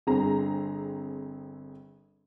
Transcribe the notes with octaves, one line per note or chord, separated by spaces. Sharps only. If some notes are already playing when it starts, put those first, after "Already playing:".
G1 C4 G#4 A#5